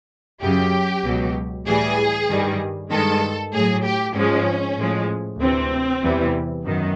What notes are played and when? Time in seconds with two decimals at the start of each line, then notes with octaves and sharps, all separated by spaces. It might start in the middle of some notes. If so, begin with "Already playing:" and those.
0.41 F#2 C#3 F#3 G4
1.04 C#2 B2 F#3
1.65 A2 E3 G3 G#4
2.28 G2 D#3 G3
2.91 G2 D#3 G#3 A4
3.53 A2 F#3 G#4
3.84 G4
4.15 G#2 F3 G#3 C#4
4.77 A2 F3 G#3
5.39 D2 C3 E3 C4
6.02 E2 C3 E3 G3
6.64 F#2 D#3 B3